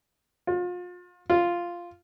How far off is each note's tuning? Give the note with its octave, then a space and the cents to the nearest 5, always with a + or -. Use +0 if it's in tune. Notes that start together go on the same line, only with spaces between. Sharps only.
F4 +35
F4 -5